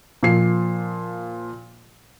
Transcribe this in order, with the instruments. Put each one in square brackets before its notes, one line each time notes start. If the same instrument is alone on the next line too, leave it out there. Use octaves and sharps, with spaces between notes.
[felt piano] A#2 F3 C7